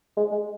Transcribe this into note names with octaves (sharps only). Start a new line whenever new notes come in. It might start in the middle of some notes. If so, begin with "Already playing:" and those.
G#3
G#3